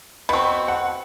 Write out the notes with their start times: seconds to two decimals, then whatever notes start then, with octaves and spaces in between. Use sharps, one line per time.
0.29 B2 C4 B5 C#6
0.68 F#5